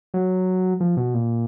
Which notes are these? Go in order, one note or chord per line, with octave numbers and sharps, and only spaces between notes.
F#3
F3
B2
A#2